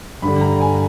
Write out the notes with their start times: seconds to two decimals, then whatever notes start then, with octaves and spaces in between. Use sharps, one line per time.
0.22 G2 D3 G3 B5
0.41 A#5
0.61 G#5